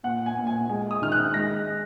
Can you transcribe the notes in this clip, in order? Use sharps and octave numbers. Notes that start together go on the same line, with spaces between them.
A#2 F#5
G#5
A#2
G#5
G#3 G#5
D#6
D#3 F6
F#6
G#3 A#6